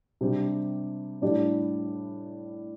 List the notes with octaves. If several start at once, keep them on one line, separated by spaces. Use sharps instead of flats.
C3 G3 D4 G4
A2 G3 D4 G4 D5